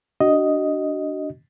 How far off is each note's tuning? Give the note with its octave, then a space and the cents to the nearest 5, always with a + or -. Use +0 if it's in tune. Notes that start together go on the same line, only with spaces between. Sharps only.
D4 +0 F#4 +30 D#5 +5